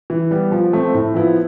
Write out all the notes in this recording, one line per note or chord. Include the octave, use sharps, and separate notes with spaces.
E3
G3 B3
F3
A3 C4
A2
F3 B3 E4